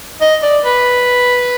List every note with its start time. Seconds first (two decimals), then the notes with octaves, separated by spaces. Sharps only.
0.21 D#5
0.43 D5
0.64 B4